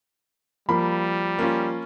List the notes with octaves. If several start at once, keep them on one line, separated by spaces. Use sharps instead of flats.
F3 G3 A#3 B5
A#3 C#4 F4